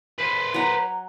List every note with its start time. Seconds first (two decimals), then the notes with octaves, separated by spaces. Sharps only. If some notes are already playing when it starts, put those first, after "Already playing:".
0.18 B4 C5
0.54 F#3 A#5